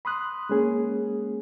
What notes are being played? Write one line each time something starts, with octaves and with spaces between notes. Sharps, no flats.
B5 C6 D#6 F#6
G#3 A#3 C#4 G#4